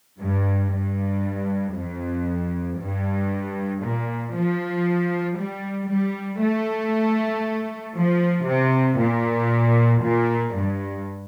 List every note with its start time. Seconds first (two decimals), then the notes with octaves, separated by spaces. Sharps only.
0.20 G2
0.72 G2
1.75 F2
2.79 G2
3.82 A#2
4.34 F3
5.37 G3
5.89 G3
6.41 A3
7.96 F3
8.48 C3
8.99 A#2
10.03 A#2
10.55 G2